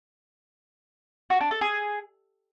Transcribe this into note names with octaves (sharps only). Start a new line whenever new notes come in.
F#4
D4
A4
G#4